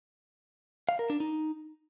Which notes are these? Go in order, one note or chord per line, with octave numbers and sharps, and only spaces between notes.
F5
A#4
D4
D#4